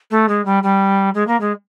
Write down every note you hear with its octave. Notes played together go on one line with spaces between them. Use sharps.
A3
G#3
G3
G3
G#3
A#3
G#3